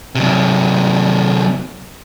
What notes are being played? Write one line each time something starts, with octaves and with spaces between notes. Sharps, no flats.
C3 F#3